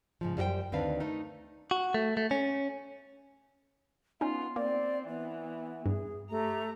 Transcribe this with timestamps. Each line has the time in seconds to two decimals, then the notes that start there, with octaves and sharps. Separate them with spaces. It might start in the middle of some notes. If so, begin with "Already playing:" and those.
0.21 G#2 C#3 F3
0.37 F#2 G3 E4 G4 C5 G5
0.72 D2 D#3 C4 D4 B4 F5
1.00 A3 D#4 A#4
1.71 F#4
1.94 A3
2.17 A3
2.31 C#4
4.21 B3 C#4 D#4 F4
4.56 A#3 C4 D5
5.08 E3 B3
5.86 G2 G#4
6.30 A3 G4 A#5